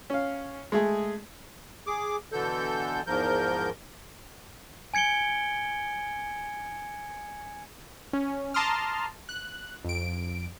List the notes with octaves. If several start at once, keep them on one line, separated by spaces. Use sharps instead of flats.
C#4 F5
G#3 A3 G#4
G#4 D6
B2 D3 E3 A4 G6
E2 G#2 F3 A#4 G6
G#5 G#6 C#7 D7 G7
C#4
A5 A#5 C6 D6 D#6 F6
F#6
F2 D7